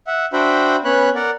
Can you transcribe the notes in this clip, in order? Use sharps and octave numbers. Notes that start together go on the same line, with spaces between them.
E5 F#5
D4 F#4 C5 E5 G5 B5
B3 C#4 C#5 B5 F#6
A#4 D5 F#5